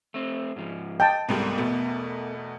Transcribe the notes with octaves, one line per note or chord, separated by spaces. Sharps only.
A3 C4
G#2 F3
D#5 G5 A5
C2 G#2 G3 B3 A4 A#4
E2 B2 A3